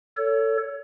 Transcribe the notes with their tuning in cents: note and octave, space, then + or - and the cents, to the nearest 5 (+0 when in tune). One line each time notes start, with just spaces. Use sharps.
A4 +20 C#5 +25